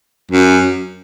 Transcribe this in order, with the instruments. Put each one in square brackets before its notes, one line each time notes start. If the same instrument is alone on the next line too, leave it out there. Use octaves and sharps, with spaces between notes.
[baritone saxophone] F#2